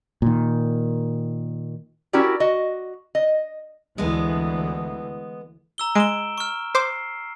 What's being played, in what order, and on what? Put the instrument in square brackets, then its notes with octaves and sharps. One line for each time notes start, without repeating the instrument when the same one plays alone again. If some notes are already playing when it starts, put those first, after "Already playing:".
[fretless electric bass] A#2 D#3
[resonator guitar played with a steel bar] C#4 E4 F#4 G4 A#4 D5
F#4 D#5
D#5
[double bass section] D2 E3 [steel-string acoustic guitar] G#3 B3
[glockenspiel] A#5 E6 G7
[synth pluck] G#3 [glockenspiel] D7 E7 G7
[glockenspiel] C#6 F6
[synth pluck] C5 D6 [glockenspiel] C7